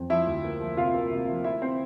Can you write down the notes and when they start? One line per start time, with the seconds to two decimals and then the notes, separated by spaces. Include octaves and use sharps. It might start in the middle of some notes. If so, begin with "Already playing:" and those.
Already playing: F2
0.10 F3 E4 E5
0.27 D2
0.45 A#3
0.60 F3
0.77 C3 F4 F5
0.94 A#3
1.11 C3
1.29 F3
1.44 E4 E5
1.62 C4 C5